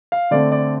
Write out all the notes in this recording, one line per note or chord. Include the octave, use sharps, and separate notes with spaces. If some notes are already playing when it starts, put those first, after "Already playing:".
F5
D3 A3 C4 D5
D5